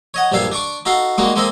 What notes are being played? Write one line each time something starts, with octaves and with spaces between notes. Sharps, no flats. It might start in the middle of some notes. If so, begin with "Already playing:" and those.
C#5 D#5 F#5
A#1 G2 A#2 G3 A4 F5
D4 D5 C#6 D6
D#4 F#4 A4 F5
G3 G#3 A#3 D#4 F#4
G#3 A#3 C4 A4 D#5